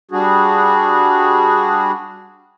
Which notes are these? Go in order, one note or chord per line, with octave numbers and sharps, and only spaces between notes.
G3 D4 F#4 G#4